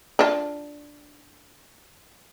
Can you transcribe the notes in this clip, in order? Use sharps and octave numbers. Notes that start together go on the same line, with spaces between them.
D4 F4